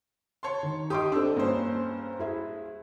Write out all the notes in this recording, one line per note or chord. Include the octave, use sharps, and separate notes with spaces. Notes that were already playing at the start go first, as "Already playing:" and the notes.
C#5 A5 C6
D#3
G4 D#5 C6 D6 D#6
C4 D4 A4 E6
G2 A#3 C#4 C5
E4 G#4 E5